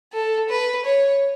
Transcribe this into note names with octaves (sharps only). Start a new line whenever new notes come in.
A4
B4
C#5